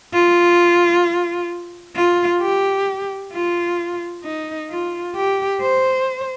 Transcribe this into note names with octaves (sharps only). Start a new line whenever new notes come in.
F4
F4
G4
F4
D#4
F4
G4
C5